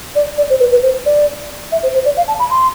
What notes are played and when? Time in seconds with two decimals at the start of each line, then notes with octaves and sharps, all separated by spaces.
0.15 D5
0.38 D5
0.50 C5
0.60 B4
0.71 B4
0.83 C5
1.06 D5
1.72 E5
1.83 C5
1.94 C5
2.05 D5
2.17 F5
2.28 A5
2.39 B5
2.50 C6